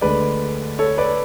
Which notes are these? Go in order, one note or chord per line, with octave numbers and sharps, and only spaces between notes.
D2 D3 G#3 B4 D5
A4 C#5
B4 D5